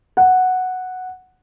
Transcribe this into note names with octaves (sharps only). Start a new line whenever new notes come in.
F#5